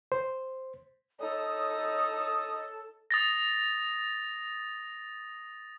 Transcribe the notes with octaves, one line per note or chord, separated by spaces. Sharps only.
C5
D#4 A4 C#5 D#6
D#6 A6 A#6